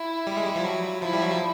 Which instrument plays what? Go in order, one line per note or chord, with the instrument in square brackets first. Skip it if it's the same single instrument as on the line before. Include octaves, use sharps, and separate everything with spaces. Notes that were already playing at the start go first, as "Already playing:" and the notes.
Already playing: [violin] E4
[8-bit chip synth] G3
G#3
G3
F3
F#3
[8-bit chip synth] F3 [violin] E4
[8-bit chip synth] G3
F#3
F3